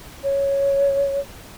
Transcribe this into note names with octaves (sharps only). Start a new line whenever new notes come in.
C#5